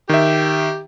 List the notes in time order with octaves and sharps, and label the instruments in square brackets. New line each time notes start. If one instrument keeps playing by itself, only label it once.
[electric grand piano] D#3 E5 [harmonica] G4